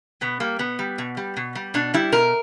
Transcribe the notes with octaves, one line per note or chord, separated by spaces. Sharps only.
B2 B3
G3 A#3
B2 B3
G3
B2
G3
B2
G3
B2 D4
G3 E4
B2 A#4